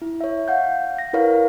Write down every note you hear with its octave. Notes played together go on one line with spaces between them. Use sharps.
E4
C#5 E5
F5 F#5 G6
A#6
E4 A#4 B4 C#5 F5